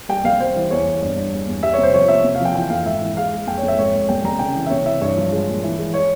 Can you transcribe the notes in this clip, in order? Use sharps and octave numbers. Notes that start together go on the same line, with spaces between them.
G3 G5
C2 F5
G3 C5
E3
E2 C#5
E2
G2
G2
E2
E2
G3 E5
C3 C#5
C5
F3 C#5
C3 E5
C3
F5
F3 G5
E3 G5
F2 F5
G#2 E5
E3
G#3 F5
G#3
F2 G5
C#5
F2
E5
G#2 C#5
G#2
C2 G5
C2 A#5
C#3 G5
E3
E5
C3 C#5
E3 E5
G2 C#5
F3
G#3
A#2
E3
G#3
C#5